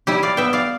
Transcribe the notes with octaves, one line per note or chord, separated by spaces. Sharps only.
G3 E4 G4
D5 F5
B3 E5 G5
D5 F5